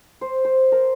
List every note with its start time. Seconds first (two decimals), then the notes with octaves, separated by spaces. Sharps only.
0.21 C5
0.45 C5
0.72 A#4